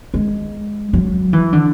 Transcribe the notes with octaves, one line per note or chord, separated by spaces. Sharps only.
G#3
F#3
E3
D3